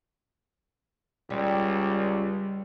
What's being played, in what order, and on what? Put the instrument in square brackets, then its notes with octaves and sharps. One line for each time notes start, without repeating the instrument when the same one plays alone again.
[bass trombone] C#2 [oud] G3